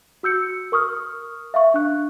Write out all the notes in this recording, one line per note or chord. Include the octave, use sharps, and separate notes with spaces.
F#4 E6 G6 C#7
A#4 C#6 D#6 F6
E5 F5 C#6
D4 F#6